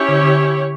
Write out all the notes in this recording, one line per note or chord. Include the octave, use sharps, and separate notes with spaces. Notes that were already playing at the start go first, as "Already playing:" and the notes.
Already playing: C#4 E4 G4 C#5
D3
D3